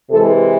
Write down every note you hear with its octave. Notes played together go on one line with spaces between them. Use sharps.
C3 E3 G#3 A4